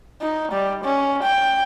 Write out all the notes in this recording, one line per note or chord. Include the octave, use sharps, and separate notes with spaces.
D#4
G3
C#4
G5